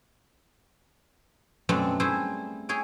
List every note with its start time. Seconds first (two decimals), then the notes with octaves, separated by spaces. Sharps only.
1.69 F#2 B2 A3 C4 D4
2.00 G3 A3 E4 G#4 C5
2.69 E4 G#4 C#5 G5